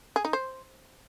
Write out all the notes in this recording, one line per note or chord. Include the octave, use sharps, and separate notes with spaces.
G#4
D#4
C5